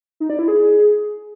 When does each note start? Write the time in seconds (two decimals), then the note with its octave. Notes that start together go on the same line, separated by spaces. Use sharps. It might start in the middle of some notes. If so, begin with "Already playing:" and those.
0.20 D#4
0.30 D5
0.39 E4
0.48 G#4